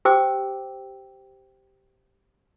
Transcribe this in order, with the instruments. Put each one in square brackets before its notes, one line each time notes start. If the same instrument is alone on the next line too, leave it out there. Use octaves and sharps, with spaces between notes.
[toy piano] G4 C5 G5 D6 E6